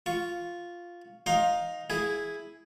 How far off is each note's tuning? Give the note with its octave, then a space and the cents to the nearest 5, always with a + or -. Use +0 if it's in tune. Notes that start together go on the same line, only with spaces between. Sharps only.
F4 +0 C#6 +0
D#4 +0 F5 +20 C6 +25
E4 +0 G#4 +0